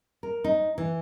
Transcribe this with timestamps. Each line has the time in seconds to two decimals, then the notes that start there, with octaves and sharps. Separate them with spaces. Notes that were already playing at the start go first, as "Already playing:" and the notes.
0.23 A#4
0.44 D#4
0.78 E3